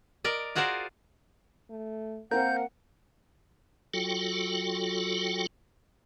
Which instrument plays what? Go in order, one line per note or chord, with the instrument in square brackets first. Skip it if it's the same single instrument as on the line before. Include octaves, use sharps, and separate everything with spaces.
[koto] A#4 D5 D#5
F4 F#4 G#4 A#4 C5 D5
[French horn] A3
[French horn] A#3 [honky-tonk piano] C4 A#4 [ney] F#5 [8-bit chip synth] G6
[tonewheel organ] F#3 F4 F#4 A4 G5